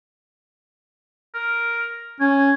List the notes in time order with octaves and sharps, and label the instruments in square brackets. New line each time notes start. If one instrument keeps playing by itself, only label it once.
[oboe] A#4
[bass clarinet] C#4 [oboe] G#5